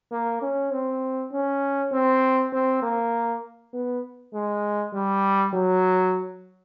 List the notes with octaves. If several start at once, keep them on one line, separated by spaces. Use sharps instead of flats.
A#3
C#4
C4
C#4
C4
C4
A#3
B3
G#3
G3
F#3